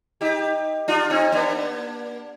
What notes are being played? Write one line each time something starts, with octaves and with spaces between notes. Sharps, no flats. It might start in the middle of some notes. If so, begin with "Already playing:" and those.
D#4 G4
D4 F4
C4 D#4
A#3 D4